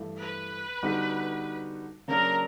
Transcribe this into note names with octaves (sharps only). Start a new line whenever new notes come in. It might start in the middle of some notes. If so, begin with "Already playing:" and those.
Already playing: G2 E3 A3
B4
D3 G3 B3 D#4 F#4
C#3 F#3 A#3 D4 A#4